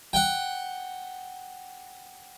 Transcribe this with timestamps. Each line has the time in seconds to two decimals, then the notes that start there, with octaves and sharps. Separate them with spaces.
0.13 F#5 G5